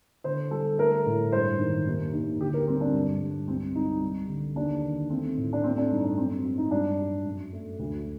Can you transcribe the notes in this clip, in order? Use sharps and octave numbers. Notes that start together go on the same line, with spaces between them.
D3 C5
G3 A4
A3 A#4
A2
G2 C5
D#3
D#2
D#2
D3 G4
A#4
G3 C4
D4
G2
G2
C2 C4
C2 D#4
G3
D3
D#2 D4
D#3
A3 C4
A2
D4
A3 C4
D4
G2 D#4
D4
F#3 C4
C4
F#3
D#4
G2 D4
F#3
F#2
A3
D2